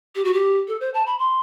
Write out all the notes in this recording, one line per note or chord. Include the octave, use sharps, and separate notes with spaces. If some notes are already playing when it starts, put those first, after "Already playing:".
G4
F#4
G4
A4
C5
A5
B5
C6